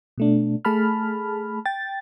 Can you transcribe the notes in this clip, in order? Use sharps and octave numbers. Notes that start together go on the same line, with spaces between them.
B2 A3 D4
A3 G#4 A5 B5 F6
G5 A6